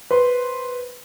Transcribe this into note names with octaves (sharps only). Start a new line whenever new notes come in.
B4 C5 C6